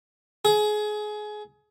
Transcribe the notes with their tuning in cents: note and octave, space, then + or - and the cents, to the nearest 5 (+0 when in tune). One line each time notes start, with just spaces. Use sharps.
G#4 +25